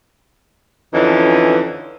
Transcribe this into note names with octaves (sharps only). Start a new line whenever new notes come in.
F2 D3 E3 C#4 D#4